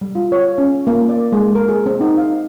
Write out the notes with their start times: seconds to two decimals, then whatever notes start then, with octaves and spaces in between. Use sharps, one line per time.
0.01 G3
0.15 F4
0.32 C#5
0.58 C#4
0.87 A#3
1.09 D5
1.32 G#3
1.55 A#4
1.69 G#4
1.86 C4
2.01 D#4
2.17 F5